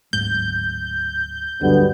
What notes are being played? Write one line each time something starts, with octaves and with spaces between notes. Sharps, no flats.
D1 G#2 G6
D2 G2 D3 F#3 G3 B3